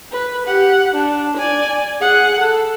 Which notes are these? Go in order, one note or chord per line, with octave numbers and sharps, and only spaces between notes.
B4
G4 F#5
D4
D5 G#5
G#4 F#5
A4